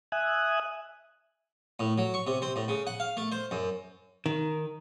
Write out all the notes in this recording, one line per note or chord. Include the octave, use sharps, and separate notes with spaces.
E5 G#5 D#6 F#6
A2
F#3
C#6
C3
C4
A2
C#3
F#5
F5
A3
C5
F#2
D#3